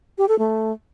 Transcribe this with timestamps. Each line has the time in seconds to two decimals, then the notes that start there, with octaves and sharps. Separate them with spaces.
0.18 G4
0.28 A4
0.39 A3